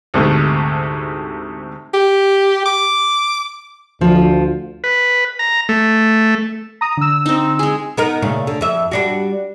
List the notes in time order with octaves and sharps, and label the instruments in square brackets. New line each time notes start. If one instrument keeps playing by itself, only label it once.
[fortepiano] D2 G#2 C3 A3
[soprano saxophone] G4
D6
[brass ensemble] D2 [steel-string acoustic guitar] F3 F4
[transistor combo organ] B4
A#5
A3
[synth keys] A#5 D#6
D3 E6
[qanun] C4 D#4
G#3 G#4
[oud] B3 D#4 A#4
A#2 C#3 A3
D3
F2 E5
G3 D4 F#4